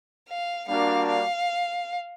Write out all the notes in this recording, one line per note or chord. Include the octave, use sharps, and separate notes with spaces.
F5
G3 A#3 D4 F#4 A#4 F5
F5